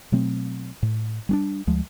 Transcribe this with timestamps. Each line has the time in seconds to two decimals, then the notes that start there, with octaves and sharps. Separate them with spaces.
0.12 B2 F#3 A3 C4
0.83 A2
1.29 G3 C#4 D4
1.67 D2 F3 G#3